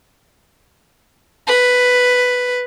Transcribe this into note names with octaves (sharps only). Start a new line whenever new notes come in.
B4